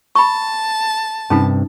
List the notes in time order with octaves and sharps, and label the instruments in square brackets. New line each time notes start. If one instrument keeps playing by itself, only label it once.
[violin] A5 [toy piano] B5 C#6
[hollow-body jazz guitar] G2 C3 B5 [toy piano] C#4 D#4 A4